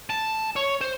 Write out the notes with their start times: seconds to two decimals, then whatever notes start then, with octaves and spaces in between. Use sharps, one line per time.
0.10 A5
0.56 C#5
0.81 C5